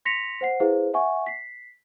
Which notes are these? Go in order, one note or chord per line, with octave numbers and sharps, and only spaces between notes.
C6 A#6 B6 C#7 F7
C5 F#5 C7
E4 G#4 B4 C5 F5
E5 F#5 G#5 C#6
B6 C7